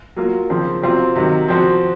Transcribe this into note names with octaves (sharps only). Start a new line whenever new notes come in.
F#3 A#3 F4
C#3 F3 C4
C3 F#3 C4 F4
C3 D#3 F#3
F3 C4 F#4